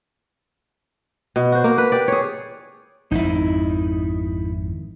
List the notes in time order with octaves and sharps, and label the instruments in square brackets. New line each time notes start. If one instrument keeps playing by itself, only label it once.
[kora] B2
F#4 C5
A#3
B4
G4 D5
G#4 C#5
[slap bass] G#1 F2 D#3 [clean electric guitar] D#4 E4